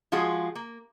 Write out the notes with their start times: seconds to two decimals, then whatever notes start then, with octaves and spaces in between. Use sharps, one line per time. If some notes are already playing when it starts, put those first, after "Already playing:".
0.12 F3 G#3 F4 F#4 G#4
0.55 A#3